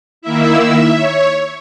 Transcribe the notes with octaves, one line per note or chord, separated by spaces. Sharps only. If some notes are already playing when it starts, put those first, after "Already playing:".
D#3 A#3 E4 E5
C#5